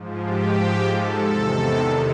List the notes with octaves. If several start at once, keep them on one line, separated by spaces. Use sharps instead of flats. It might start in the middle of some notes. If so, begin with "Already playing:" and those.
Already playing: G#2 F3
G4
A4
E2 C3 D#3